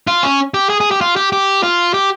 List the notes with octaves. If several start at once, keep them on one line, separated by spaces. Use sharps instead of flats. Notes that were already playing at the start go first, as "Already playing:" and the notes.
F4
C#4
G4
G#4
G#4
G4
F4
G4
G4
F4
G4